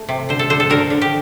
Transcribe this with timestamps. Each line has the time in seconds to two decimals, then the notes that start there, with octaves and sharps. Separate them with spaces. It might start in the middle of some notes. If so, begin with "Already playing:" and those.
Already playing: A3
0.09 C3
0.29 D3 C5
0.39 A4
0.50 D3 C5
0.60 A4
0.70 D3 A#4
0.90 D3
1.02 G4